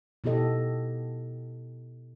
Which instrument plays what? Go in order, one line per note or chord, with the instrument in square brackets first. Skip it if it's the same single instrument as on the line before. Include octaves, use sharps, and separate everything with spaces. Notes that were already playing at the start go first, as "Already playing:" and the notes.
[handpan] B2 B3 E4 G4 A4 D#5